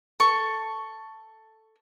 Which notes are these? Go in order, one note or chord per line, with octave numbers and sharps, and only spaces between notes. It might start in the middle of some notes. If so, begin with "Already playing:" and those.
A4 C#6